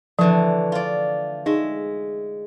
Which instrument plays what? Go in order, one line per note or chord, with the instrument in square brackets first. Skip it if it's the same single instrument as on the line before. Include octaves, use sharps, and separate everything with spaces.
[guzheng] D3 E3 A3 [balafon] F3
[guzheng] F4 D5
[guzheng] G#3 E5 [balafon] D#4